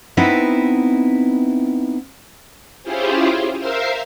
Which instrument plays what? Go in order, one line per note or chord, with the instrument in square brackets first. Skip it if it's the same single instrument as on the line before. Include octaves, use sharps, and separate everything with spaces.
[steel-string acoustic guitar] B3 C4 D#4 E4 B4 E5
[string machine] C#4 E4 F4 G4 G#4 C5
A#4 C5 E5 F5 C6